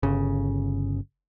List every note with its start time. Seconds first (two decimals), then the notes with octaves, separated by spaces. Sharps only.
0.03 G1 C#3